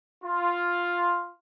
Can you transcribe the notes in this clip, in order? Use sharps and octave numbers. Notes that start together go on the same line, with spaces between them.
F4